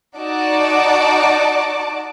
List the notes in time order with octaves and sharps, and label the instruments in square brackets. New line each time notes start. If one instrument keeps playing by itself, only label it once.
[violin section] D#4 F#4 D5 A5 D6